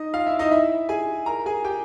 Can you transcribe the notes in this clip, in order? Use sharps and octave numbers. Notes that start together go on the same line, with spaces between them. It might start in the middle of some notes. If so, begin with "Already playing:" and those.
Already playing: D#4 D#5
F4 F5
E4 E5
D#4 D#5
E4 E5
G#4 G#5
A#4 A#5
G#4 G#5
G4 G5